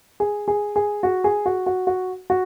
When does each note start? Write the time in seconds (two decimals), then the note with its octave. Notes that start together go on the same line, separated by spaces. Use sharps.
0.20 G#4
0.48 G#4
0.76 G#4
1.03 F#4
1.24 G#4
1.46 F#4
1.66 F#4
1.87 F#4
2.30 F#4